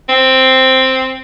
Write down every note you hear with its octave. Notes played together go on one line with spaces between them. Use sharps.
C4